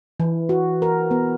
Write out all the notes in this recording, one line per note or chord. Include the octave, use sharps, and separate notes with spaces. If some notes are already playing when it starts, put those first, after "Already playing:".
E3
F#4
A#4
B3